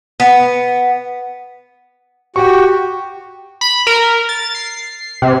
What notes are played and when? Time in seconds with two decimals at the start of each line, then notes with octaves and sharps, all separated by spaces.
0.20 B3
2.36 F#4 G4 G5 C#6
3.61 B5
3.87 A#4
4.29 A6
4.55 C7
5.22 C3